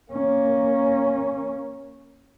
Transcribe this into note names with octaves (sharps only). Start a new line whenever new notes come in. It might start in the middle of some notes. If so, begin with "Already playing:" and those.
A#3 C#4